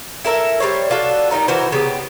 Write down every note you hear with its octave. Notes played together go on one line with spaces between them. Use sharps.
E4 A4 A#4 E5
G3 B3 C5 C#5
D4 F4 F#4 A4
D#3 G3 D#4 A#5
E3 F#4 A#4 C5
C#3 B3 G4